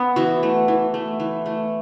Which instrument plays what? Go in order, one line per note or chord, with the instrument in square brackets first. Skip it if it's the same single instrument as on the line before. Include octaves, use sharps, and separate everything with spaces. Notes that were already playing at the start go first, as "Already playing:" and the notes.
Already playing: [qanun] B3
E3 F#4
A3
E3
A3
E3
A3